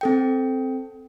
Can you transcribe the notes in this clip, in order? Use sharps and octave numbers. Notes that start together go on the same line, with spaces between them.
C4 A4 G5